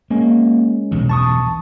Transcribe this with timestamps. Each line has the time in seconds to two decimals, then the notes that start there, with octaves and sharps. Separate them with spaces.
0.10 G#3 A#3 C#4
0.91 B1 E2 G2
1.09 A5 C#6 D#6